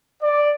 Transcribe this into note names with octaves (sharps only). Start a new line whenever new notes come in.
D5